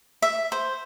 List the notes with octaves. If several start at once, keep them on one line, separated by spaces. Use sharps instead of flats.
E5
C5